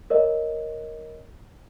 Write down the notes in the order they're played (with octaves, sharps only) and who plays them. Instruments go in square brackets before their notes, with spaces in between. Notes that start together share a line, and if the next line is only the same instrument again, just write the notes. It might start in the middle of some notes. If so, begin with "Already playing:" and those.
[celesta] A#4 C#5 D#5